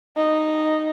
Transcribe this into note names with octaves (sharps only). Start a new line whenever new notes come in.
D#4